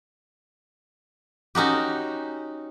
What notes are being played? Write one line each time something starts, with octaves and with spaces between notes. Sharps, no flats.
C#4 D#4 F#4 G4